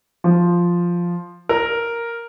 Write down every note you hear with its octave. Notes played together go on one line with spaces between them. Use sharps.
F3
A#4